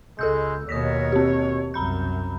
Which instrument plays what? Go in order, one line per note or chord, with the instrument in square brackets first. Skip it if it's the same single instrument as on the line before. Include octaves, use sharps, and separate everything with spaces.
[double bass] C#2 [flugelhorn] G#3 [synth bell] A4 E6 G6
[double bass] D#2 B2 [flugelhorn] C#5 [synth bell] D#6 A#6 B6
[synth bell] C4 G4
[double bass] C2 F#2 [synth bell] A#5 B5 G6